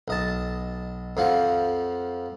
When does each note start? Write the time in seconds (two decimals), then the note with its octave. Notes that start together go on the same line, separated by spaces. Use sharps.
0.08 B1 D#5 A5
1.17 F2 F3 F5 F#5